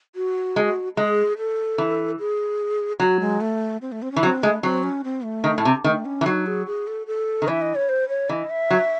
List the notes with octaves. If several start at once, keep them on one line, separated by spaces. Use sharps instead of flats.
F#4
G#3
G#3 G#4
A4
E3
G#4
F#3 F#4
G#3
A3
C4
A3
C4
C#4
E3
F#3 C4
G#3 A3
F#3 C4
C#4
C4
A3
D#3
A2
C3
D#3 A3
C#4
E3
F#3 D#4
G#4
G#4
A4
A4
D#3
E3 E5
D#5
C#5
C5
C#5
E3 D#5
E5
F#3